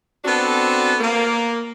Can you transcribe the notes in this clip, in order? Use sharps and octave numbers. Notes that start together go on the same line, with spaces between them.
B3 C4 D4 F#4 A4
A#3